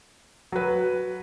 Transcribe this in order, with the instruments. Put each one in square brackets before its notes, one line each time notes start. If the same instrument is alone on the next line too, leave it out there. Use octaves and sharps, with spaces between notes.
[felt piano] F#3 B4